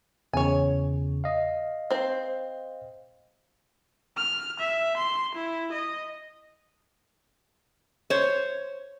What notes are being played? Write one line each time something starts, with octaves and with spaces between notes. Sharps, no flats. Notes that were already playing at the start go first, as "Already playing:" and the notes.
E2 C#3 C#5 G#5
D#5 F5
C4 C5
F6
E5
C6
E4
D#5
C5 C#5